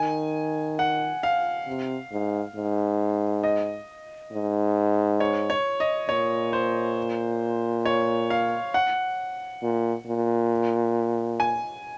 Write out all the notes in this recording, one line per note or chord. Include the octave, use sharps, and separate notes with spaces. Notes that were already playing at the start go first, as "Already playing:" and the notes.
Already playing: D#3 G#5
F#5
F5
C3
G#2
G#2
D#5
G#2
C#5
C#5
D#5
A#2 C#5
C5
C#5
F5
F#5
A#2
A#2
G#5